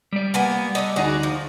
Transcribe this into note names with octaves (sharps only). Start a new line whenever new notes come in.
G3 D5
A#3 B3 G#5
A3 D4 D#4
D2 D#4 F#4 G#4 D5
F3